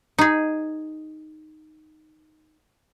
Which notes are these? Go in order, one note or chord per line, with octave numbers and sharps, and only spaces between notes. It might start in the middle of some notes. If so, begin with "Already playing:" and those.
D#4 G#4